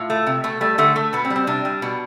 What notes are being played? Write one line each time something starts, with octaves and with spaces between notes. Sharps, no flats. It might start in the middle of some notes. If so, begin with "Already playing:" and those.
Already playing: A2 F4
A3
C3
B2 A3
G3 A3
D3 A3
A3
B2 B3
C4
G3
C4
C3 D4
G3
B2